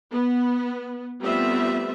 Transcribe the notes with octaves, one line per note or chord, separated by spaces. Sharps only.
B3
G3 A3 B3 C4 F4 E5